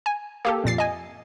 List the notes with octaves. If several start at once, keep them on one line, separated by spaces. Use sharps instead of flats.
G#5
A#3 G4 A4
F2 A#2 A6 C7
D#5 G#5